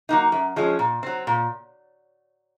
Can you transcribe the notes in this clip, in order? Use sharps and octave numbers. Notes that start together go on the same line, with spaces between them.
F#3 A#3 D#4
F#2
F3 G#3 C#4
A#2
F#3 C4
A#2